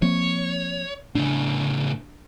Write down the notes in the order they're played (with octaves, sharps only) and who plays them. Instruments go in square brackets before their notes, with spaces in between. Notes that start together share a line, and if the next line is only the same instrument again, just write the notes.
[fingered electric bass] F3 A#3 C4 [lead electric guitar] C#5
[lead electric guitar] A2 C#3 [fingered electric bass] D4